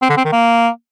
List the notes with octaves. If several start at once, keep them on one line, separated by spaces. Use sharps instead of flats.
C4
D3
C4
D#3
A#3